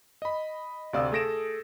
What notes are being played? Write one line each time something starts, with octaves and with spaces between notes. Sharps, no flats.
D#5 B5
D2 C3 D5 F5 D#6 E6
A3 G#4 A4 A#6 D7 E7